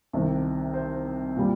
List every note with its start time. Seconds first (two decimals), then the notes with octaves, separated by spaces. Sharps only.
0.13 C2 C3 D#3
0.74 C5
1.36 A#2 G3